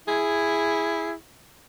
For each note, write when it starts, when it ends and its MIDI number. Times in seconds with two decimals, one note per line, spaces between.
0.08 1.14 64
0.08 1.13 68